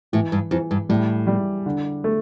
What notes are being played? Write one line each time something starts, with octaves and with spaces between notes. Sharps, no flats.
A2 E3
G2
F2 E3
G2
A2 G3
G3
D3
A3